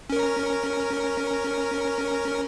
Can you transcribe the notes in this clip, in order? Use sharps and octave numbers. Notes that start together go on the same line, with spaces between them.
C#4 A#4